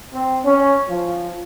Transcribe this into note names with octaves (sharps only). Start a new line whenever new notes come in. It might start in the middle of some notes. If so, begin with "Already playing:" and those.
C4
C#4
F3